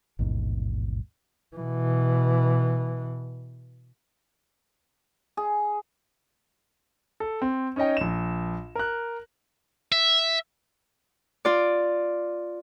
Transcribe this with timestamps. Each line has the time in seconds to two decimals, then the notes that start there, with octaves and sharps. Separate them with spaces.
0.19 A1 D#2 G#2 B2
1.56 B2 E3
5.37 G#4
7.20 A4
7.42 C4
7.76 C#4 D#4 C#5 D#5 G5
7.97 A#1 E7
8.75 A#4 F#6
9.92 E5
11.45 F4 D5